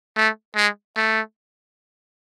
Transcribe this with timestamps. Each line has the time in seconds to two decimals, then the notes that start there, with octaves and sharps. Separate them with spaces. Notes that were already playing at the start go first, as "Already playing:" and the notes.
0.16 A3
0.56 G#3
0.96 A3